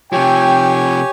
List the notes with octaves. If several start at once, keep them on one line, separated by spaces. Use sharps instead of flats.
C3 F3 G4 C#5 G5 G#5